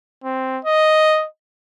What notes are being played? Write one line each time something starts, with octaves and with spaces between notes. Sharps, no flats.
C4
D#5